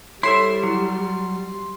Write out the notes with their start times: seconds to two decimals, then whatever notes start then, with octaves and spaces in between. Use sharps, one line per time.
0.23 G3 E4 A4 C5 C#5 E5 C6
0.63 F#3 E4